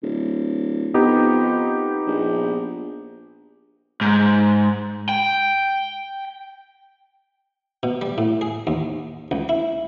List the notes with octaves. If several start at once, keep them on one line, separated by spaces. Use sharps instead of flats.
D1
F2 B3 D#4 G4
A#1
G#2
G5
B2
G3
A2
G#4
D#2
C#2
E4